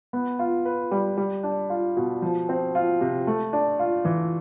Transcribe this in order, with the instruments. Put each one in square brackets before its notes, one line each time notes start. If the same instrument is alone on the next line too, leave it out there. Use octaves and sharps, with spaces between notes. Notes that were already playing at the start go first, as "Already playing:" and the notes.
[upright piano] B3
F4
B4
G3
G3
D4
F4
B2
F3
C4
F4
C3
A3
D4
F4
E3